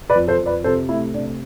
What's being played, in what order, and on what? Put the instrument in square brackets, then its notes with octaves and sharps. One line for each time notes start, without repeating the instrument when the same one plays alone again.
[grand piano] B4 D5
F2
A4 C5
F2
B4 D5
C3 A4 C5
A3 E4
C3 D4